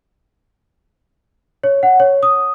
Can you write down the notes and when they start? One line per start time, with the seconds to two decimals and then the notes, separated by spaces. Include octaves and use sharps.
1.64 C#5
1.83 F#5
2.00 C#5
2.23 D#6